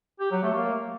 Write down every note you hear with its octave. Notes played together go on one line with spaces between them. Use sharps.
G4
F#3
A3
A#3